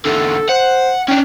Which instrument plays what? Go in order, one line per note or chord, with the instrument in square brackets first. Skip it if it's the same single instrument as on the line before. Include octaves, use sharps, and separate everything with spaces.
[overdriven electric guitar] E2 D3 [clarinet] A4
[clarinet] C5 [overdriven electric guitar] F#5
[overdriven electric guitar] C#4 D4 [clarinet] G5